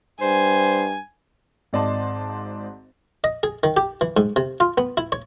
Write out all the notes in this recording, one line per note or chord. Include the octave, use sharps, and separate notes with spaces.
G2 C5 G#5
G#1 G#2 D5 D#5 A5 C6
D#5
G#4
D#3
G4
E3
G#2
C3
F4
B3
E4
C#5